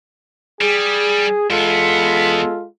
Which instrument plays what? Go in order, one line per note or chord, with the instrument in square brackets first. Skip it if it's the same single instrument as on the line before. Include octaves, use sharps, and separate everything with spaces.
[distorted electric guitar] G3 [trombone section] G#4
[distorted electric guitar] E2 B3 [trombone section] G#3 F4 A4